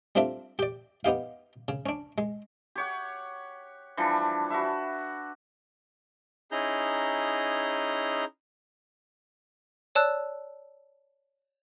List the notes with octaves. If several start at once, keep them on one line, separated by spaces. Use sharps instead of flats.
G3 C4 D4 F4 A4 E5
G4 D5
B3 D#4 G4 F5
C#3
C#4 D4
G#3
G4 C#5 F#5
E3 F3 G3 D4
F#4 B4 E5
C#4 D#4 E4 G#4 A#5 G6
C#5 D5 A5 E6 F#6